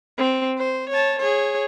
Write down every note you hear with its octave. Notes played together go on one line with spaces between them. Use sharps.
C4
C5
C#5 A5
G#4 C#5